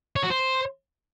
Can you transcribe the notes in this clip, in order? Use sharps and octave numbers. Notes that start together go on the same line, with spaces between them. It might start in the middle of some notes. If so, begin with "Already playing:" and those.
C#5
F#4
C5